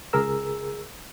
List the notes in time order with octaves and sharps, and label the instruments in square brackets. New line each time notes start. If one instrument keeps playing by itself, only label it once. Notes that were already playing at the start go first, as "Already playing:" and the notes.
[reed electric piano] C#2 G#4 A#4 E6